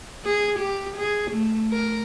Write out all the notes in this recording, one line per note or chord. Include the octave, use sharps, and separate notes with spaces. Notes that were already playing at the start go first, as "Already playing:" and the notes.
G#4
G4
G#4
A3
A#4